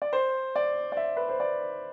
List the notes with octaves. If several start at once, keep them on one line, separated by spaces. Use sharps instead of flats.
D5
C5
D5
D5
E5
B4
C5
D5